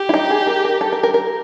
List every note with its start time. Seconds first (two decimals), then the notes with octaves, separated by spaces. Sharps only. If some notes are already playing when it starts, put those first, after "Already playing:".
Already playing: G4
0.09 E4
0.14 D#4
0.30 G#4
0.47 A#4
0.65 A#4
0.81 A4
0.92 A#4
1.03 A#4
1.14 A#4